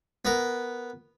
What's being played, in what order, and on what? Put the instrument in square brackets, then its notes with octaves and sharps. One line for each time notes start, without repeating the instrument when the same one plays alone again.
[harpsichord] B3 A#4